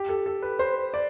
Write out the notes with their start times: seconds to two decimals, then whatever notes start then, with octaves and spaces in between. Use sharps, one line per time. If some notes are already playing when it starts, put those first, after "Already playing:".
Already playing: G4
0.09 A4
0.26 A4
0.42 B4
0.59 C5
0.94 D5